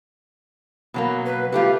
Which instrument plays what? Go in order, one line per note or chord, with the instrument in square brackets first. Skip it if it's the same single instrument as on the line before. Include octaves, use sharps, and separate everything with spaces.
[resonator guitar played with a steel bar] B2 F#3 A#3
[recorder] B4
[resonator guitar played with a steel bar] G3 A3 F4 [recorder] G4